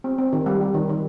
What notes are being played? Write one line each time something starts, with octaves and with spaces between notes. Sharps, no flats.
C4
C4
D#3
G3
G3
D#3
D#3